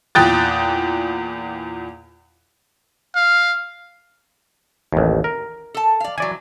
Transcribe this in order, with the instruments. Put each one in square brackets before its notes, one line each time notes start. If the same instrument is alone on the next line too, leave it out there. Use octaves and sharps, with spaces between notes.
[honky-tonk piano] E2 A#2 G5 D#6 F#6 A6
[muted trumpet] F5
[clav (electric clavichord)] A1 D#2
A#4
[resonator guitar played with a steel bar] A4 A5
D5 F5
[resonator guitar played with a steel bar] E3 F#3 [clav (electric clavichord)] D5 G#5